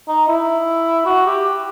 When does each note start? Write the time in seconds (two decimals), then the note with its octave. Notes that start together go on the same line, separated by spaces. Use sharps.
0.08 D#4
0.28 E4
1.06 F#4
1.26 G4